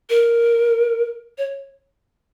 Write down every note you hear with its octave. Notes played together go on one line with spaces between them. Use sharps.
A#4
C#5